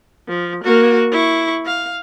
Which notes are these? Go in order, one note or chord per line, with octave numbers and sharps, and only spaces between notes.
F3
A#3 F#4
E4 C#6
F5